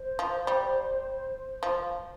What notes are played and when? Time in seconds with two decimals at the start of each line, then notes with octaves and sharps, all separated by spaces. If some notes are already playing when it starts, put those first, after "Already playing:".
Already playing: C5
0.19 F3
0.47 G3
1.63 F3